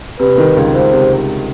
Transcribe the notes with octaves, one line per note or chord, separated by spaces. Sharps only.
C3 B4
D#3
C#2
C#2 C5
C3